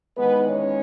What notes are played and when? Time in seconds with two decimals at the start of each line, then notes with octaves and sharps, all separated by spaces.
0.17 E2 D#3 G#3 B3 B4
0.49 C#4 C#5